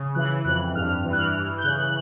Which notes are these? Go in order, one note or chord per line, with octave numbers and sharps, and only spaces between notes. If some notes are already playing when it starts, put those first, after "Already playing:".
Already playing: C#3
E3 F#6
F2 F#6
G2 F6
E3
F#6
F6
E3
G6
C#3 F#6